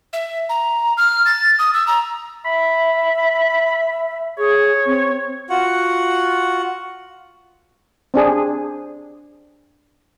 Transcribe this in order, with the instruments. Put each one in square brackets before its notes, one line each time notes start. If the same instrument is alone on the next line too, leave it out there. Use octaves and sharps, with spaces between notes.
[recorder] E5
A#5
F6
A6
D#6
E6
A#5
[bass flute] E5 [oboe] B5
[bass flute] G#4 [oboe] C#5
[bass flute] C4
[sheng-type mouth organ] F4 F#4 F#5
[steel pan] C4 D4 G#4